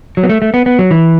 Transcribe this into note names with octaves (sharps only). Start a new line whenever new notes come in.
F#3
B3
A3
A3
B3
B3
F#3
E3